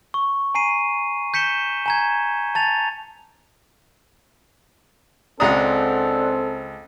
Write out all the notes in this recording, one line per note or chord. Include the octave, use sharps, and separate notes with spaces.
C#6
G#5 A#5 C7 D#7
G6 B6 C#7 E7 G7
G#5 A#5 G#6
A5 A6 F7
C#2 C4 D4 A4 F#5 A#5 D#6